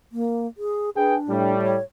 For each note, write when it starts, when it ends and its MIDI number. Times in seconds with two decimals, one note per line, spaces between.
0.12 0.47 58
0.57 0.90 68
0.97 1.55 62
0.97 1.16 68
0.97 1.16 71
0.97 1.16 79
1.29 1.77 45
1.29 1.77 55
1.62 1.82 73